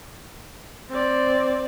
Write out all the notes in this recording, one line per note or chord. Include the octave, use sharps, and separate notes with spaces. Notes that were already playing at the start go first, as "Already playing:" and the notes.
C4 D5